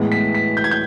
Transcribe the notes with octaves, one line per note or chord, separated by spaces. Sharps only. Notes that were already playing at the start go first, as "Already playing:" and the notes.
Already playing: A2 E3 G#3 B3
B6
B6
G6
G#6
G6